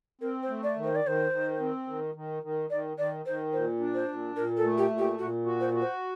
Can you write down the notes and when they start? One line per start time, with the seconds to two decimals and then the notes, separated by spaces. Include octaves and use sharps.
0.21 C4 A#4
0.42 C5
0.49 A3
0.63 D5
0.76 D#3
0.84 C5
0.95 D5
1.04 D#3 C5
1.31 D#3
1.60 C4
1.87 D#3
2.15 D#3
2.43 D#3
2.70 D#3 D5
2.97 D#3 D5
3.25 D#3 C5
3.52 A#2 C5
3.80 D4
3.94 C5
4.08 A#2
4.36 A#2 A#4
4.57 A4
4.63 A3
4.77 G4
4.90 A#2
4.98 G4
5.18 A#2 F#4
5.46 F#4
5.60 C5
5.73 F#4
5.81 C5